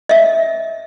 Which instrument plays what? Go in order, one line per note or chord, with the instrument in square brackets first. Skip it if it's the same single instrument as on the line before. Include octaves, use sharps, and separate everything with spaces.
[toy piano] D#5 E5